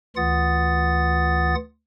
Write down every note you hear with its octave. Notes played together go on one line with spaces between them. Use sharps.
D2 E3 F4 F#5 D#6 A6